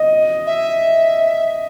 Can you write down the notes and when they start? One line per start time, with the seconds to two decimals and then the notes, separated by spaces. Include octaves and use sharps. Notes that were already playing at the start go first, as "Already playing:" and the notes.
Already playing: D#5
0.46 E5